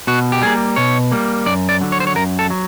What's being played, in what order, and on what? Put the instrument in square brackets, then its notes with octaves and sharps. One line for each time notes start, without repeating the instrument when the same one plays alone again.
[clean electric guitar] B2 F#4
G4
G3 A#3 G#4
B2 C#5
G3 A#3
F#2 D5
D5
D3 F#3
C#5
C5
C#5
F#2 A#4
A4
F#3